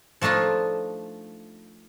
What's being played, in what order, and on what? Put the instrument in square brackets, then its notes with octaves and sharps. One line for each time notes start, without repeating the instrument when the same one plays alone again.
[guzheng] F3 A3 D4 D#4 F4